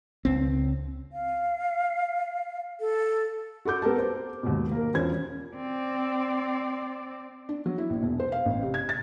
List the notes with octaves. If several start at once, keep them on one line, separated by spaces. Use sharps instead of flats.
C#2 C4
F5
A4
F#4 A4 D6 G6
B3 G4 A4 A#4 A5
C5
D#2 G#2 B2
A#3 A#4
E1 C#4 F4 C5 G#6
C4 D5
D4
F#3
E4
A#1
E1
C5
F5
A1
C3
G#6
A6